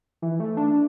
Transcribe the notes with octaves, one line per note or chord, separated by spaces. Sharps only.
E3
A3
D4